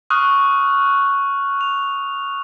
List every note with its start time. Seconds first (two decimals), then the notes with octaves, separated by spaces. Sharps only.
0.10 C#6 D#6 F6 F#6
1.61 F7